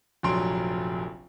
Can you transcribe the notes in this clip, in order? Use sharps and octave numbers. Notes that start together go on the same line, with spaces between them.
F1 A#1 F#3 C6 D7